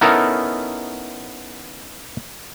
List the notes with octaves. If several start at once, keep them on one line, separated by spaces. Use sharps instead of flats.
B3 C#4 D#4 E4 A4 A#4